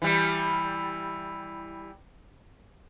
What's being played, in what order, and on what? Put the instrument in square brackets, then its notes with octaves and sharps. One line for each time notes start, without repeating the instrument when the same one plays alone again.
[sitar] E3 G3